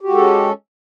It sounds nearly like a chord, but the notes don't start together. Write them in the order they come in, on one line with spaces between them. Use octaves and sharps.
G4 F#4 G#3 A4 C#4